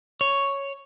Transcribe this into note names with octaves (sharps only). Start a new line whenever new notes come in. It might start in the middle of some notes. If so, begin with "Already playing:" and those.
C#5